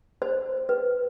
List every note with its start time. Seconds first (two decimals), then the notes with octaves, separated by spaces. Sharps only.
0.22 C5
0.69 B4